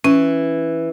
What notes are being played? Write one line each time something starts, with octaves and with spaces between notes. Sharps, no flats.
E3 C#4